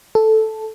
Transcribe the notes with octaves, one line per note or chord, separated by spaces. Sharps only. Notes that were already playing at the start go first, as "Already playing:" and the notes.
A4